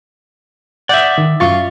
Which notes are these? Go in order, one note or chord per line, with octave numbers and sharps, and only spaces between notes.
D5 E5 F#5 G6
D#3
F#2 F4 C#6 A6